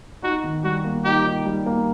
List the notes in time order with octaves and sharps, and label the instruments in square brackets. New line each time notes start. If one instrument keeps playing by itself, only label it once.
[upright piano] D#4 [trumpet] F#4
[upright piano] D#3
[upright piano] G3 [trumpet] F#4
[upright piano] A#3
[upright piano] D#4 [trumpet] G4
[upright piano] D#4
G3
A#3